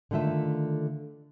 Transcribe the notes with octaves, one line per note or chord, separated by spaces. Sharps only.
D3 D#3 A3 F4 E5